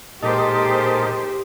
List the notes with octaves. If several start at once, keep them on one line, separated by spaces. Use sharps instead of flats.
A#2 G#3 D#4 G4 A4 A#4 C5 D#5